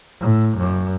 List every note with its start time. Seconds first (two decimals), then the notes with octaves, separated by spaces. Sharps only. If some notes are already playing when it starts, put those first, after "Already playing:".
0.20 A2
0.57 F#2